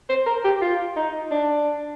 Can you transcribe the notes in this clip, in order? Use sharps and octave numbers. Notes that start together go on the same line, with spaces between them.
C5
A#4
G4
F4
D#4
D4